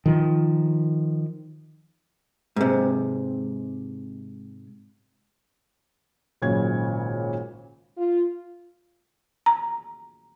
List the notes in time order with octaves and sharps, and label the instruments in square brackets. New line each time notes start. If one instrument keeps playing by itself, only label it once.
[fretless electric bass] D#3 F3
[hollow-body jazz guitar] G#2 C3
[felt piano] G#1 A#2 C#3 F#3 C#5 G#6
[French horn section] F4
[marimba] A#5